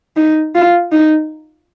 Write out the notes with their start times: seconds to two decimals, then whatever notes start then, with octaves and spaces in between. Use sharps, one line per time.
0.16 D#4
0.55 F4
0.92 D#4